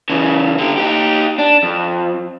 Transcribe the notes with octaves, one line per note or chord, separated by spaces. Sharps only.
C#3 E3
D3 G4
D#4 G4
D4
F2